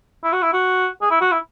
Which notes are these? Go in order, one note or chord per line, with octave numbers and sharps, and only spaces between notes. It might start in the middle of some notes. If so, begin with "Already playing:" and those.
E4
F#4
E4
F#4
G#4
E4
F#4
E4